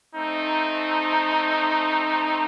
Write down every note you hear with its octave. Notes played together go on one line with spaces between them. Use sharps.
A3 C4 D#4